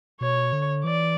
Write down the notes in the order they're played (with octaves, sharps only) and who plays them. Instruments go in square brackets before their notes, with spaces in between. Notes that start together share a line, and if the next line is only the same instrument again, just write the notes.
[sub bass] B2 [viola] C#5
[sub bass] D3
[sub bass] E3 [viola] D5